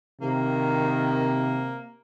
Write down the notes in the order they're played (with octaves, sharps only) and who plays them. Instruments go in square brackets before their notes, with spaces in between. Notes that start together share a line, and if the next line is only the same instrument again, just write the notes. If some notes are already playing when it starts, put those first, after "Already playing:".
[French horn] C3 [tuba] D#3 [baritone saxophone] A#3